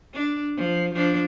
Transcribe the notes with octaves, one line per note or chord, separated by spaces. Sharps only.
D4
F3
F3 D4